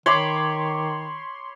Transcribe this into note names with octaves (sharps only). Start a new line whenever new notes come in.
D#3 C#5 B5 C6 D6